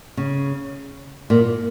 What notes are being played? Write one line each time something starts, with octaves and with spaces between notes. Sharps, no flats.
C#3
A#2